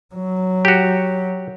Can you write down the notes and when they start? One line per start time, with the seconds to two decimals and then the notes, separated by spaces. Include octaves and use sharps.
0.15 F#3
0.65 F#4 G4